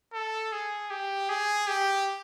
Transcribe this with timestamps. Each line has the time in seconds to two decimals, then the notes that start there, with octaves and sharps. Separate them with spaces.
0.14 A4
0.52 G#4
0.91 G4
1.29 G#4
1.68 G4